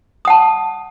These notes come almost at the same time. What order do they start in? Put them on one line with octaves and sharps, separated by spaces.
D#6 F#5 A5